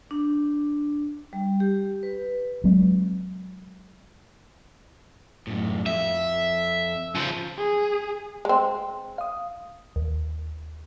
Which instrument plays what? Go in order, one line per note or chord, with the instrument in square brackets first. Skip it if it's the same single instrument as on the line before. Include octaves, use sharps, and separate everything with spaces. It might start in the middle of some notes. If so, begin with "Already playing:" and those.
[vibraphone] D4
G3
G4
B4
[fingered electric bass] F#3 G#3 C4
[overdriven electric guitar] F#2 A2
[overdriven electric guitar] F2 [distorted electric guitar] E5
[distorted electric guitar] C#3 F3
[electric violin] G#4
[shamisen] G#3 C4
[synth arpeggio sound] F5 D#6
D#2